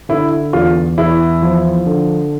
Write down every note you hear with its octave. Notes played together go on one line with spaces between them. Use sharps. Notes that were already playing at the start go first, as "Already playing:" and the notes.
D3 E4
E2 F4
E2 E4
F3
D3